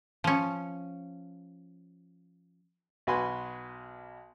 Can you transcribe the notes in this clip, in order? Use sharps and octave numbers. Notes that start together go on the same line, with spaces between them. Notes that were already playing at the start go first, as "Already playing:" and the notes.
F3 C#4
B1 F#4 B4 G#5 B5 C6